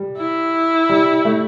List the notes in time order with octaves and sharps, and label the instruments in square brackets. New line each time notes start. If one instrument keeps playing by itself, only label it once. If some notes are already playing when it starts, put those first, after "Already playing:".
Already playing: [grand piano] G3
[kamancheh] E4
[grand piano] G3
A3